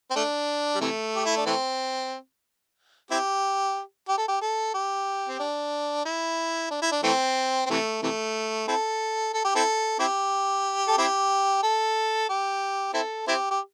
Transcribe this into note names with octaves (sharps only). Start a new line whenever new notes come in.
C4
A3 D4
G3
C3 E3 A3
G4
E4
D4
E3 A3 C4
C4 E4 G4
G4
A4
G4
A4
G4
C4
D4
E4
D4
E4
D4
E3 A3 C4
C4
C3 E3 A3
C3 E3 A3
C4 E4 A4
A4
G4
C4 E4 A4
C4 E4 G4
A4
C4 E4 G4
A4
G4
C4 E4 A4
C4 E4 G4
G4